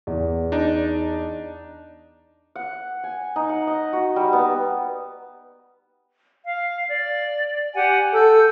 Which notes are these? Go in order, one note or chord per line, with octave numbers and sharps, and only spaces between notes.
E2
D4 D#4
F#5
G#5
D#4
F#5
D#5
F#4
G3
B3
F5
D5
G4 F#5 G#5
A4 E6 G6